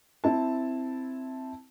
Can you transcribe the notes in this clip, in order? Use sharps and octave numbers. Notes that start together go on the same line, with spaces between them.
C4 E4 A5